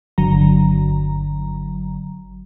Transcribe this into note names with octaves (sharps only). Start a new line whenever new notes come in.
G1 D3 F#3 A#5